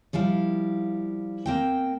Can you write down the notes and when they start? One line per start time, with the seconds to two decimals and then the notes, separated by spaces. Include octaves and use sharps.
0.13 F3 G3 E4 F5
1.46 A#3 C4 G5